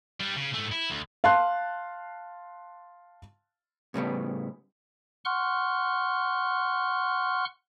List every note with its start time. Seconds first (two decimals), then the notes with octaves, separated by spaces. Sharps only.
0.20 G3 D4
0.36 C#3
0.55 G#2 A3
0.72 E4
0.90 D2
1.24 F5 A5 C6 F#6
3.94 A2 C#3 G3 B3
5.25 F#5 C6 C#6 F6 F#6